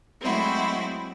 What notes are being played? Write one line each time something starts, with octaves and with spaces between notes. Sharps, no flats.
F#3 G#3 A3 C4 E4 F#4